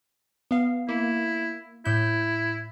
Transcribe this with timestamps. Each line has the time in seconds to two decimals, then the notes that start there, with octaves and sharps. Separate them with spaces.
0.51 B3 F5
0.89 A#3 E4
1.85 A2 E4 G6